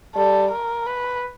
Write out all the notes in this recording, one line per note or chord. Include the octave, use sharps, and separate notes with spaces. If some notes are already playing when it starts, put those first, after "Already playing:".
G3 A4
A#4
B4